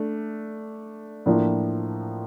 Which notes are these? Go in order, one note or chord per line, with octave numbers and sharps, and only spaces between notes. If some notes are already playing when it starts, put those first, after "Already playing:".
Already playing: A3 D4
A2 F3 A#3 D4